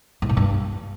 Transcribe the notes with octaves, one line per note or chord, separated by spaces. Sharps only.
G#2
A#2
G2